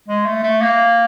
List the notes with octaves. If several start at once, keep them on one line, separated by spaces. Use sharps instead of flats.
G#3
A3
A3
A#3